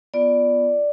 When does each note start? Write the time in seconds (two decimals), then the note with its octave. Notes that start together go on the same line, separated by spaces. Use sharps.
0.14 B3 F4 D5